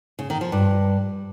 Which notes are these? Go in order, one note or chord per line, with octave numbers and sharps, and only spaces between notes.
C#3
D#3
F3
G2